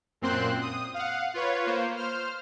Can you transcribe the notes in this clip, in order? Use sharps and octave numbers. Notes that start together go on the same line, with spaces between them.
F#2 A#2 C4 C5 C6 F#6
D#6
F5 F#5
F4 B4 C#5
A#3 C5
C5 F6